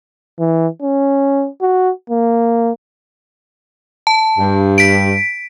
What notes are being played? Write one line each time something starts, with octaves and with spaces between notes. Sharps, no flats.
E3
C#4
F#4
A#3
A5
G2
B6 D7